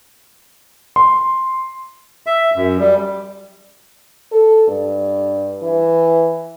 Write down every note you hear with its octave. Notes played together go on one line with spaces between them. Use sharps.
C6
E5
F#2
G3
A4
G2
E3